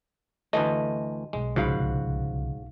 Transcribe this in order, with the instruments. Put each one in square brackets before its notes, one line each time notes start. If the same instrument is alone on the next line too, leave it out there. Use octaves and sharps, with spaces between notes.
[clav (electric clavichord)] D2 E3 A3 [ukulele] D#5
[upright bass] B1 [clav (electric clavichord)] G#3
[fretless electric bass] C2 C#3 F3 [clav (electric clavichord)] G#2 [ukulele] F#4 F5 B5